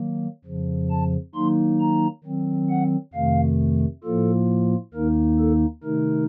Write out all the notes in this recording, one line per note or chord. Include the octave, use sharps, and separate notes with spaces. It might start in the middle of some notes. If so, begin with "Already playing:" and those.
Already playing: D#3 F#3 A#3
F2 C#3 F3
A5
D#3 F#3 A#3 D#4 C6
A#5
D#3 F#3 C4
F#5
F2 C3 D#3 A3 F5
A2 F3 A#3 F4 A4
D#2 D#3 A#3 D#4 A#4
A4
C3 D#3 A3 D#4 A#4